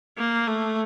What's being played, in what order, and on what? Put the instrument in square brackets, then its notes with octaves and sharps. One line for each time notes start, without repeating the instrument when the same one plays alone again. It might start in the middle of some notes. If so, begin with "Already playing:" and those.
[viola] A#3
A3